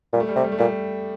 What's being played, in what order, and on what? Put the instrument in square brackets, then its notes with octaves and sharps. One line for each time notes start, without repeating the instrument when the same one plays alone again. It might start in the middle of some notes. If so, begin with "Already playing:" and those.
[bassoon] A#2 [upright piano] G3
[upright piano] A3
G3
[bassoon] C3 [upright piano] A3
[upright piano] G3
A3
[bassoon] A#2 [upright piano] G3